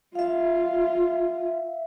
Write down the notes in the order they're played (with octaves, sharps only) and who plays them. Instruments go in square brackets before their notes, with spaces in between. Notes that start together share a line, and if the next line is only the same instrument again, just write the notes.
[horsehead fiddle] F4 [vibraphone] E5 F5